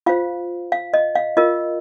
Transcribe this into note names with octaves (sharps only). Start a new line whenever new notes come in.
F4 C5 F5
F5
D#5
F5
F4 A#4 D#5